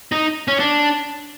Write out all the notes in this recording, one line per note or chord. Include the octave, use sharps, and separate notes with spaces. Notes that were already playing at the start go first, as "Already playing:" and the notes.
D#4
C#4
D4